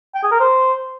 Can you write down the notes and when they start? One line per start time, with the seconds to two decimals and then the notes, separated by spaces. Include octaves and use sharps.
0.14 G5
0.23 G#4
0.31 A#4
0.40 C5